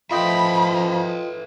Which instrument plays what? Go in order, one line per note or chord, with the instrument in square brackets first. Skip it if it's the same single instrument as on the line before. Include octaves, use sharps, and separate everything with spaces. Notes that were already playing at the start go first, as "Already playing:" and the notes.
[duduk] F3 [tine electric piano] F4 D#5 G5 [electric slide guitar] A4 B4 E5 [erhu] B5